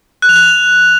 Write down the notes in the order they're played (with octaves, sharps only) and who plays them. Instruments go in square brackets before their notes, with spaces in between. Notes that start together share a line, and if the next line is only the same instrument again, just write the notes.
[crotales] F#6
F7
F#6
F7